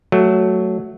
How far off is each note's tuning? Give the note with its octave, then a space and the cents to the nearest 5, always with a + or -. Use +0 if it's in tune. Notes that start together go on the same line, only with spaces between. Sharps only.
F#3 +5 A3 +0